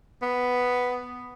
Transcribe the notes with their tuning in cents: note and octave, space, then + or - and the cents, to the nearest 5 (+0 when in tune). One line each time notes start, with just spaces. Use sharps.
B3 +5